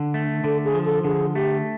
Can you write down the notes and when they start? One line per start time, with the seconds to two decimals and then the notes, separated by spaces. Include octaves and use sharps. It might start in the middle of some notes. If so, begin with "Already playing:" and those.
Already playing: D3
0.14 A3
0.44 D3 A4
0.64 G#4
0.74 F3
0.85 A4
1.04 D3 G#4
1.35 A3 G4